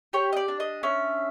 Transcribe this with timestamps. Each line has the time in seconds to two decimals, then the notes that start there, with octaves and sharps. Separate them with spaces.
0.13 G4 C#5
0.32 D#5
0.36 D5
0.48 D4
0.60 D#5
0.83 C#4 E5